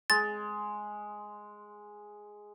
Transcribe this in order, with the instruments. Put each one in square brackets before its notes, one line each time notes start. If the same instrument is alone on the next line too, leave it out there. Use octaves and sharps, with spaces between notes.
[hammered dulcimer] G#3 [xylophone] A6